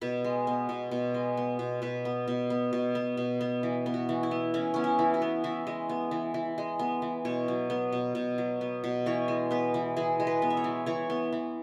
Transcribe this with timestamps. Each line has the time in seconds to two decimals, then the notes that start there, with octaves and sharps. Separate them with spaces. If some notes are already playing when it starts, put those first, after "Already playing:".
0.01 B2 B4
0.24 G#3
0.47 B3
0.69 B2
0.91 B2
1.14 G#3
1.37 B3
1.59 B2
1.82 B2 B4
2.05 B3
2.28 B2
2.50 B3
2.73 B2
2.95 B3
3.17 B2
3.41 B3
3.63 E3
3.86 B3
3.94 F#4
4.09 E3
4.23 E4
4.31 B3
4.54 E3 C#4
4.74 B3 C#4
4.84 E4
4.99 E3
5.14 F#4
5.22 B3
5.44 E3 E5
5.67 G#3
5.89 B3
6.11 E3
6.34 E3
6.58 G#3
6.79 B3
7.02 E3
7.25 B2 C#5
7.48 F#3
7.70 B3
7.92 B2
8.15 B2
8.38 F#3
8.61 B3
8.84 B2
9.06 E3 C#5
9.28 G#3
9.51 B3 B4
9.74 E3
9.96 E3 G#4
10.20 G#3
10.27 B4
10.42 B3
10.50 E5
10.57 C#5
10.64 E3
10.86 E3 C#5
11.10 B3
11.32 E3